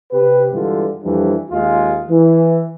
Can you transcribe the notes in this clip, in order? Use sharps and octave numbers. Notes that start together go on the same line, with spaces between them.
C3 G4 B4
G2 D3 E3 G#3 F4
F2 E3 F3 G3 D4
D#2 G#3 F4
E3